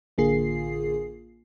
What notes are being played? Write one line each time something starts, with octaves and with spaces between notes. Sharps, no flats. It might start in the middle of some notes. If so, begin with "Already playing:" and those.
A1 D3 A#3 F4 G#4 C7